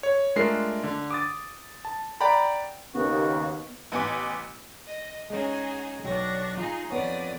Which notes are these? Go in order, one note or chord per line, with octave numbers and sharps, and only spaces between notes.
C#5
G#3 A3 D4 F4 A#4 C7
D3
D6 D#6 A6
A5
D5 F#5 G5 A#5 B5
D#2 C#3 B3 F#4
A1 B3 G#5 D6
D#5
G#3 C#4 D#4 F#4 G#4
B1 F#3 D4 G5 C#6 A#6
D#4 F4 G#4
F2 B3 C#5 D5 D#6